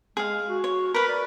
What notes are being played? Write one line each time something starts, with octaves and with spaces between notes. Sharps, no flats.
G#3 G#4 F5
F#4
C#5
A#4 B4 B5
D5